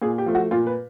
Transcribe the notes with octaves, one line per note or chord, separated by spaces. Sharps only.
A#2 G#4
G4
F3 A3
F#4
A#2 F4
B4